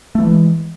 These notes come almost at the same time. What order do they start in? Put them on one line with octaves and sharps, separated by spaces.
A3 E3 G#3